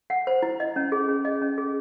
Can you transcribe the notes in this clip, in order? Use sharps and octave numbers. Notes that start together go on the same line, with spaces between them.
F#5
C5
E4
D#5
C#4
G#4
C#4
D#5
C#4
G#4